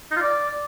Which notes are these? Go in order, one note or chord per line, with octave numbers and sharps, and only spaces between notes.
D#4
F4
D5